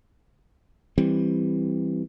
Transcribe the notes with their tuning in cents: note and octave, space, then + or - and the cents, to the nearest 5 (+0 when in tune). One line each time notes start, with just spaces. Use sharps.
E3 +0 G3 +5 C4 +0